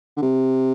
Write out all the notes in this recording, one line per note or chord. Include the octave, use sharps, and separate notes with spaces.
D3
C3